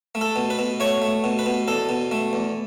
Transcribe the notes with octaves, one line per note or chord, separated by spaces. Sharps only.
A3
A4
B2
B4
B2
A3 C#5
A3
B2
B4
B2
E2 A4
B2
A3
E2